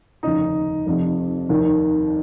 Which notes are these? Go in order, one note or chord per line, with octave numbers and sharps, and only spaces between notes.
F1 D#2 C#3 D#4
F1 F2 C3
F1 D#2 D#3